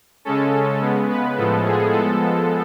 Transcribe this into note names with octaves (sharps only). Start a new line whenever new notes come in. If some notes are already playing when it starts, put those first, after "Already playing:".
C#3 G#3 C#4 A4
C#3 G#3 B3
B4
A2 F3 G#3 B3 A4
G#4
F3 G#3 B3 A4